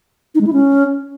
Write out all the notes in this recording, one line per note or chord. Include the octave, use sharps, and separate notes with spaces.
D#4
G#3
E4
C#4